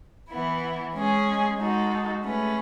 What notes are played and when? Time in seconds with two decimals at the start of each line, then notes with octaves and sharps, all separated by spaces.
0.29 E3 B3 E4
0.93 G#3 C#4 G#4
1.57 G#3 D#4 F#4 A4
2.21 A3 C#4 G#4 B4